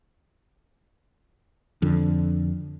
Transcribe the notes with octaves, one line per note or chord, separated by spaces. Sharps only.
F2 D3